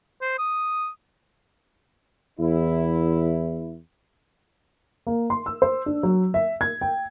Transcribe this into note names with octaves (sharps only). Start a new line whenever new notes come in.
C5
D#6
E2 E4
A#3
C6
E6
C5
D4
F#3
E5
G#6
G5